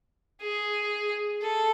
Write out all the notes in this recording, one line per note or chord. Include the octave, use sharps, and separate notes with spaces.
G#4
A4